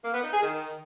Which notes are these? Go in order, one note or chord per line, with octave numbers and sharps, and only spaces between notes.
A#3
B3
D#4
G#4
D#3